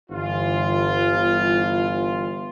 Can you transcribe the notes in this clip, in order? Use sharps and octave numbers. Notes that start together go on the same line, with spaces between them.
G1 E3 F4